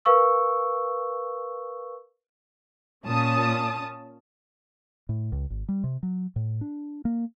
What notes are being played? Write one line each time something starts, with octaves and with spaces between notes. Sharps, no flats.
A#4 B4 F5 C#6 E6
A#2 C#4 A5 D#6
A2
C#2
G#1
G3
C3
F#3
A2
D4
A#3